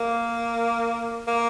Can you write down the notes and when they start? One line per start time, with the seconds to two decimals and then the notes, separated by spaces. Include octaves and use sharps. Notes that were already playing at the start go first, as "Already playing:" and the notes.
Already playing: A#3
1.27 A#3